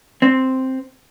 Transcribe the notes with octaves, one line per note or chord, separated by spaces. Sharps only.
C4